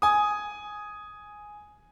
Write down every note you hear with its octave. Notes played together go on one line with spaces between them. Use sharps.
G#5 D#6